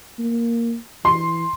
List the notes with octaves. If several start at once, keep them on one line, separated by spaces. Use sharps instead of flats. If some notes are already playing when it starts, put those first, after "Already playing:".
A#3
E3 C6